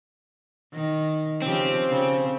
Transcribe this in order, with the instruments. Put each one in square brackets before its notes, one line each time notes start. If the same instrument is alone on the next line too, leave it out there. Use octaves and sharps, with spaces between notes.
[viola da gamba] D#3
[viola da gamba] C#3 F3 G4 [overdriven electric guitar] C4
[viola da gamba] C#3